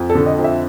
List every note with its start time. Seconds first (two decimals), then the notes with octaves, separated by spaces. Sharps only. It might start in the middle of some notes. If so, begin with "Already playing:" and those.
Already playing: F2
0.10 A4
0.15 D3
0.26 D#5
0.38 F2
0.44 E5